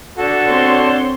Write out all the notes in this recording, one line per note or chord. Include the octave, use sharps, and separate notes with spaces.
D4 F#4 A4
C4 C#5 C6